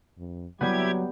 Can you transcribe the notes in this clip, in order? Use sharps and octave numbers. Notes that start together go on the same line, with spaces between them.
F2
F#3 G3 B3 E4 G4 G#6